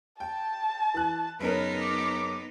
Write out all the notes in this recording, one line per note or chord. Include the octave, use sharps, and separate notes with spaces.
G5 A5
E3 F#6
F#1 B3 C#4 D#4 A#4 B4
D6